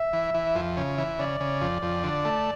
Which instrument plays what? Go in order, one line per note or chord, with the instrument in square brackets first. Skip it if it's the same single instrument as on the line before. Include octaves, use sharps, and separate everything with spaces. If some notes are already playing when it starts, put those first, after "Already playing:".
Already playing: [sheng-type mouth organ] E5
[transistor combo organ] E3
E3
F2
C#3
E3
[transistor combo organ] C#3 [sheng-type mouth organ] D5
[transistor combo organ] C#3
F2
F2
D3
A3